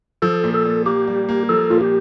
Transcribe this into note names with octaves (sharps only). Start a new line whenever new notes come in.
F3 A4
A#2
A4
A#2
A#3 G4
G3
A#3
F3 A4
A#2 F4
G4